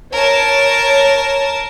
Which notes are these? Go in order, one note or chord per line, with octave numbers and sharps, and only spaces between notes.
A#4 C#5 A5